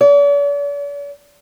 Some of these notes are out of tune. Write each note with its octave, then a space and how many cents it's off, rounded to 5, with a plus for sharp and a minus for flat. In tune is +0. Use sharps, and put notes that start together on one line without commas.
D5 -45